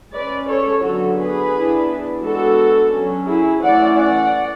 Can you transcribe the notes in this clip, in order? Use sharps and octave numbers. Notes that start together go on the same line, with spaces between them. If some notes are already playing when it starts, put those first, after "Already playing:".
G#3 C#4 B4 D5
A4 C#5
D3 F#3 B3 F#4 A4
G#4 B4
E3 B3 D4
G#3 B3 D4 F#4 A4
F#3 C#4
E4 G#4
E3 A3 C#4 D5 F#5
D5 F#5